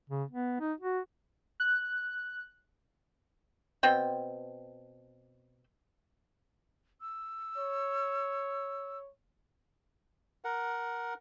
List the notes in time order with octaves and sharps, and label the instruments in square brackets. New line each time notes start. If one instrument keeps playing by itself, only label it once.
[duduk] C#3
B3
D#4
F#4
[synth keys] F#6
[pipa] B2 C4 G5
[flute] E6
[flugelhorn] C#5
[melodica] A#4 F#5